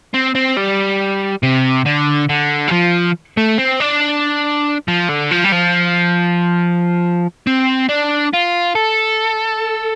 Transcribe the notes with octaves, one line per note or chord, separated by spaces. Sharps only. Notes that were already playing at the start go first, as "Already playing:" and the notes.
C4
C4
G3
C3
D3
D3
G3
F3
A3
C4
D4
F3
D3
F3
G3
F3
C4
D4
F4
A4